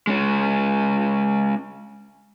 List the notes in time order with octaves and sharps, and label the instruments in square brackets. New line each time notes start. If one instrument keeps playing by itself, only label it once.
[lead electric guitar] G#3 C#4